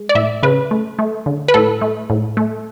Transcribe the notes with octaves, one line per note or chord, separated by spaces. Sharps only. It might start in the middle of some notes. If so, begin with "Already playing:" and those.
Already playing: G#3
D5
A2 E5
C#3 B4
A3
A3
D3
B4
A2 A4
A3
A2
A3